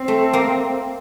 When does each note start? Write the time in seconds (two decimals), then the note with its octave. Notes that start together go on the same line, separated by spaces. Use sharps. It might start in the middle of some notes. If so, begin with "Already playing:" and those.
Already playing: C4
0.08 A3
0.33 A#3